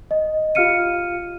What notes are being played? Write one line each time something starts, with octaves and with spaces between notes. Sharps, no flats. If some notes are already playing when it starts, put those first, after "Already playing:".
D#5
F4 G4 F5 F6 C#7 D#7